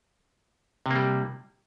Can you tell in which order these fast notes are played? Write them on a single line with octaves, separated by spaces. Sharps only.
C3 A#3 G3